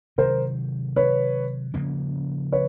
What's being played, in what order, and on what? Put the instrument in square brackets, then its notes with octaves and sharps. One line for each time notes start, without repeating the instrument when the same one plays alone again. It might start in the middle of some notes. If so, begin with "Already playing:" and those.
[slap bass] C3 D#3 F#3 [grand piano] A#4 C5
[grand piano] B4 C#5
[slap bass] C#3 F3 A#3 C#4
[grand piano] B4 C#5